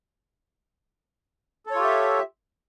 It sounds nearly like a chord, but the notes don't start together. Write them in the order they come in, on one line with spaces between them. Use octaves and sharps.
A4 C#5 F4 G4 E5